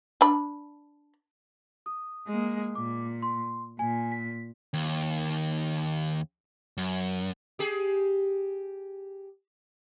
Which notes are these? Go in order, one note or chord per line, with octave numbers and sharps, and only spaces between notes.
D4 B5
D#6
G#3 A#3
A#2 D6
C6
A#2 G#5
B6
D#2
F#2
G4 G#4